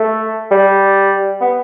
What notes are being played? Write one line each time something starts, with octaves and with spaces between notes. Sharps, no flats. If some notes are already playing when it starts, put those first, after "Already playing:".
Already playing: A3
G3
B3